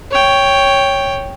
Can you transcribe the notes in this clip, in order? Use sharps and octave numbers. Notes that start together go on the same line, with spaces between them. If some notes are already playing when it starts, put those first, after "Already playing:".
C#5 G5